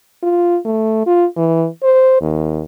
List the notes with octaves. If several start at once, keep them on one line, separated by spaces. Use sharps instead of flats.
F4
A3
F4
E3
C5
D#2